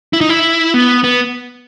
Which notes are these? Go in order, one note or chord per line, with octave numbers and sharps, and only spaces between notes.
E4
D#4
E4
B3
B3